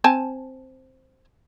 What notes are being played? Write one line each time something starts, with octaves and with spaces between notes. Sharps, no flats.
C4 G#5 A5